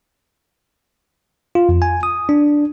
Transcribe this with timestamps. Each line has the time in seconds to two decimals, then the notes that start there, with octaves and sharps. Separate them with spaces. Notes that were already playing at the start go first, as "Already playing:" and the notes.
1.55 F4
1.69 F2
1.82 G#5
2.03 D#6
2.29 D4